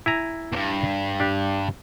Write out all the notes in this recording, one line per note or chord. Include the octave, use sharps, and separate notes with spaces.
E4 G#5 A#5
E2 G2
D4 G4